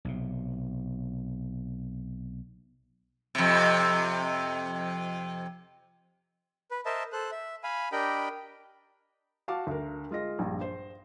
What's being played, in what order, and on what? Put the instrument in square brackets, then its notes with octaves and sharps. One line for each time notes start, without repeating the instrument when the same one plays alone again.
[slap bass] B1 C3
[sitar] F2 C3
[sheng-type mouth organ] B4
A#4 C5 D#5 E5 A5
A4 C5 F#6
E5
F5 G#5 B5
D4 G4 A#4 D#5 G5 B5
[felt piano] F#4 F5 A5 D6
D2 A#4
G#3 F4 D#5 A#6
A#1 G2
C5